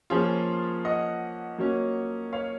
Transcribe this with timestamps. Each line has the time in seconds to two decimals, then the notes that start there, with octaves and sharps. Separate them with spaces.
0.10 F3 A#3 C#4 F4 G#4
0.85 D#5 F#5
1.58 F#3 A#3 C#4
2.33 C#5 F5